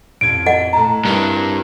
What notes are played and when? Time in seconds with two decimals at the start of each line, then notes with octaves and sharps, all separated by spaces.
0.21 A1 F2 G#6 D7
0.46 D#5 F#5
0.73 A2 A5 A#5
1.05 G2 C4 E4 A#4